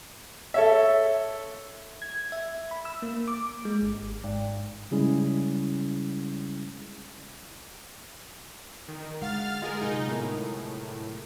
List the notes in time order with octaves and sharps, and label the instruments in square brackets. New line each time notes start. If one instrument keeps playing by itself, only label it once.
[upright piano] A4 C#5 E5
[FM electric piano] G#6
E5
B5
E6
A#3
D6
G#3
G#1
G#2
[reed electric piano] C#3 G3 G#3 C#4 E4 G#4
[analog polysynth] D#3
[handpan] D3 G#3 F#5 [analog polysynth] F5 F6 A6
[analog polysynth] G#3 G#4 A#4 [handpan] F4
[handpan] C3 F#3 G#4 [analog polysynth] D#4
[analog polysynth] A2 [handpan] B3 A#4